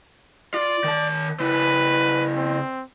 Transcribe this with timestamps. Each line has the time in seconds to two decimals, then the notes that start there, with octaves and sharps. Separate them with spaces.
0.54 F4 D5
0.84 D#3 A5
1.40 C#3 E4 B4
2.36 C4